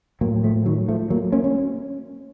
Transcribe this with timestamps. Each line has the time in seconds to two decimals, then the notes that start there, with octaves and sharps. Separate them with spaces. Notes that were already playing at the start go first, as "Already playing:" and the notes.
0.21 A2 F#3 A#3
0.44 F3 A3
0.66 D#3 F#3
0.88 F3 A3
1.10 F#3 A#3
1.32 A#3 C#4
1.44 C#4